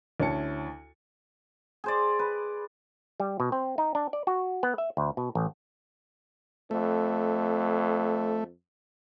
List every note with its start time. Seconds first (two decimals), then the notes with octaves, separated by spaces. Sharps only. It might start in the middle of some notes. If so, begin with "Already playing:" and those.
0.20 D2 C#4 E4 A5 C#7
1.84 G#4 C5 D5
2.19 B4
3.20 G3
3.40 B2
3.52 C4
3.78 D#4
3.95 D4
4.13 D5
4.27 F#4
4.63 B3
4.78 E5
4.97 D2
5.17 B2
5.35 A1
6.71 F2 A3